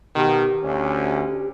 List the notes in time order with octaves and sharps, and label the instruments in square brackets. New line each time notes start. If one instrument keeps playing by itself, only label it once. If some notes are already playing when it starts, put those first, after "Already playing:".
[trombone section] B2 D#3 [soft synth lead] G4
[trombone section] D2 C#4